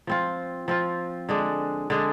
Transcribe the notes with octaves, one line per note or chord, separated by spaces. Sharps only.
F3 C4 F4
F3 C4 F4
D3 G#3 D4
D3 G#3 D4